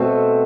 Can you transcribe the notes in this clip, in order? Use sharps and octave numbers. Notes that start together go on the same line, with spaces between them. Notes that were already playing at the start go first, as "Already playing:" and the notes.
Already playing: B2 A3 C4